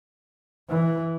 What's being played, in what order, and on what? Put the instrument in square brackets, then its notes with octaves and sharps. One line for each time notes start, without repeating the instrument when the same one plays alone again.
[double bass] E3